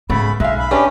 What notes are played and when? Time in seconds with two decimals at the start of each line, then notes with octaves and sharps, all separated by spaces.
0.10 G#2 C#3 A3 B3 B5
0.40 B1 G#3 E5 F5
0.58 B5
0.71 C#4 D4 G4 B4